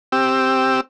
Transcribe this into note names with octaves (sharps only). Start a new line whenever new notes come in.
C4 G4 E6